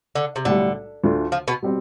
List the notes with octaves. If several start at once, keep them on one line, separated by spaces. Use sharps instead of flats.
D3
C3
B1 A2 D3 G3
D2 D3 A3 D4 F4
F3
B2 B3
B2 G3 C4